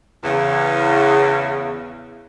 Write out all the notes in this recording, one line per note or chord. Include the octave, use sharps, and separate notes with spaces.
E2 C#3